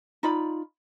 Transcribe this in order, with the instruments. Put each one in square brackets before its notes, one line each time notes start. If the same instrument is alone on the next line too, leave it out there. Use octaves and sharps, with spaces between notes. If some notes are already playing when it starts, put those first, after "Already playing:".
[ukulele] D#4 F4 D5 B5